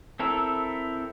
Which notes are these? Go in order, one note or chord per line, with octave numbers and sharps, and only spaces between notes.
C4 E4 A4 A#4